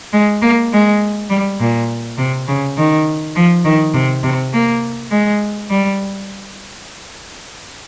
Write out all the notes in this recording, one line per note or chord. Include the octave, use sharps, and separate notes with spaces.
G#3
A#3
G#3
G3
A#2
C3
C#3
D#3
F3
D#3
C3
C3
A#3
G#3
G3